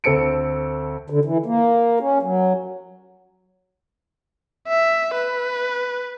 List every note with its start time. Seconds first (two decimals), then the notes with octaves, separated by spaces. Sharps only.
0.04 D2 C4 A4 C#7 D7
1.10 D3
1.25 E3
1.46 A#3
2.00 C#4
2.22 F#3
4.68 E5
5.14 B4